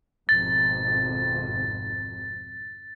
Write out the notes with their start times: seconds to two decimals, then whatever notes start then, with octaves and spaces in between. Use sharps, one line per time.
0.29 G#1 F2 B2 A6